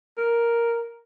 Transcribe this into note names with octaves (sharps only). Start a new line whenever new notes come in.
A#4